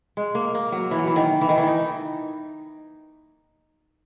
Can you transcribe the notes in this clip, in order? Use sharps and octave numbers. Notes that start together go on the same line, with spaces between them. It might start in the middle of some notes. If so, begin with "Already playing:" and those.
G#3
A#3
A#3
F#3
E3
F#3
E3
D#3
E3
D#3
E3
D#4